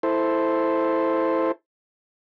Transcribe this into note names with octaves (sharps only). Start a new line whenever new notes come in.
E4 A4 C5